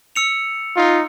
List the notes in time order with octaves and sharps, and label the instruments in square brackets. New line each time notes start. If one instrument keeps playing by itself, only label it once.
[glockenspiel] E6 C#7 F7
[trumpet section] D#4 F4